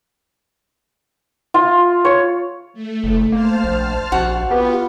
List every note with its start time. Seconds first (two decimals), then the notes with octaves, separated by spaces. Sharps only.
1.54 F4
2.05 C#5
2.74 A3
3.04 F#1
3.32 A#3 C5 A5 F6
3.64 A#1
4.12 A#1 F#4
4.51 B3 F4 G4